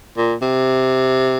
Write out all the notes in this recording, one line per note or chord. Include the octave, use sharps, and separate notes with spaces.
A#2
C3